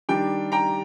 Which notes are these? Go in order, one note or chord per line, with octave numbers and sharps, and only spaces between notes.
D#3 G3 D4 G5
G5 A#5